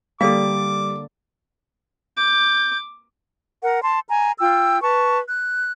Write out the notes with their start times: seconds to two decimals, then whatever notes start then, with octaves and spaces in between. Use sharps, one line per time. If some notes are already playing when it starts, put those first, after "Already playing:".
0.21 D3 G3 A#3 D4 A4 D5 F5 D6
2.17 D6 G6
3.63 A#4 F#5
3.83 A5 C6
4.10 G#5 A#5
4.39 F4 G5 E6
4.82 B4 A5 C#6
5.29 F#6